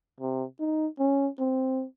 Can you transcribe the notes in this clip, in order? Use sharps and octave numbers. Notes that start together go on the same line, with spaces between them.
C3
D#4
C#4
C4